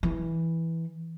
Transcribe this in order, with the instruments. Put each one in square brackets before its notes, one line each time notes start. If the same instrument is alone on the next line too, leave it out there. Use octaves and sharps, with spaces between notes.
[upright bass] E3